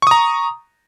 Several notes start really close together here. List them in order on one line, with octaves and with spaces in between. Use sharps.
C#6 D#6 A#5